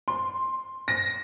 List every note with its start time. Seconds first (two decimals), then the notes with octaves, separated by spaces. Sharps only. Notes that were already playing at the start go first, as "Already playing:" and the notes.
0.08 C6
0.88 A#6